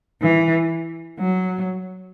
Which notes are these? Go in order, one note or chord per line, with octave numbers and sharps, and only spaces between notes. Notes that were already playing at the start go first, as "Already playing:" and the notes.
E3
F#3